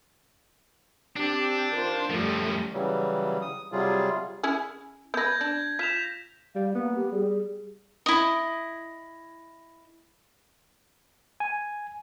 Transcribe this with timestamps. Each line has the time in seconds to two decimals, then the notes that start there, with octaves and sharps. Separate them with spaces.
1.16 C4 D4 G4
1.70 D#3 F4 C5
2.10 F#2 F3 G3 A3
2.73 C#3 E3 F#3 G3
3.42 D#6
3.72 C3 F#3 G3 F4 G#4
4.43 C#4 E4 G#4
5.14 B3 B4 G6 G#6 A#6
5.41 D4
5.79 F4 B6 E7 F7
6.55 G3 F5
6.75 A#3 B3
6.95 G4
7.12 G3 G#4
8.06 E4 D#5
11.40 G#5